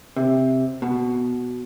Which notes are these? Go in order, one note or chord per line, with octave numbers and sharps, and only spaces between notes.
C3
B2